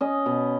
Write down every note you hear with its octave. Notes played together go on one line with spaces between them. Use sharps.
C#4 D#5
B2